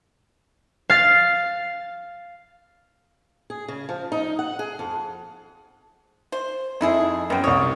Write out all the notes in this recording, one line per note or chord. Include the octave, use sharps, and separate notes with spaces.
F5 A6
G#4
C#3
F3
D#4
F#5
G#4
F2
C5
F2 D#4 E4 G#4
F#2 G3 B3 G5
C2 C#5 D#6